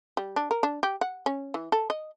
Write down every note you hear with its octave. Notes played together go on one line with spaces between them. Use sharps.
G3
D4
A#4
D4
G4
F#5
C#4
E3
A4
D#5